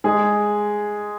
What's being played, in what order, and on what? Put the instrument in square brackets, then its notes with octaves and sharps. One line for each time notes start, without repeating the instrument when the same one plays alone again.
[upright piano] G#3 G#4